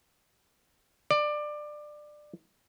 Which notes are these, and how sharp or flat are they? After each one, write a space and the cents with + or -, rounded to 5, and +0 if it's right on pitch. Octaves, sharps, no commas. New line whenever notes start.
D5 +20